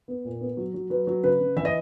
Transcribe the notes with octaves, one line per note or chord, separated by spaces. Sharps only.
B3
A#2
B3
F#3
F#3
F#3 B4
F#3
C#3 B4
C#3
E3 E5
D#5